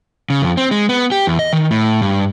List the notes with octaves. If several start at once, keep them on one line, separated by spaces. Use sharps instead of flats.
C#3
F2
C4
G#3
B3
G4
E2
D#5
D#3
A2
G2